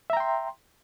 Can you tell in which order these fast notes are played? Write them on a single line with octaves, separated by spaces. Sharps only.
E5 A#5 G5 C6